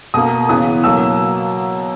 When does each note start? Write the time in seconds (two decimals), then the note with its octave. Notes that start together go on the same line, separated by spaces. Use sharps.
0.14 B2 A#3 D#6
0.49 C#3 E3 B3 D#6
0.84 B2 F#3 A#3 E6